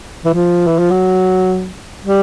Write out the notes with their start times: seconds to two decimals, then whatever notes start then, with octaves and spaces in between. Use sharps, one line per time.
0.25 E3
0.34 F3
0.67 E3
0.79 F3
0.91 F#3
2.05 G3